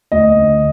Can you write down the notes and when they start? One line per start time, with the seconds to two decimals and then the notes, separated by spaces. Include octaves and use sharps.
0.12 D2 D#5
0.36 D3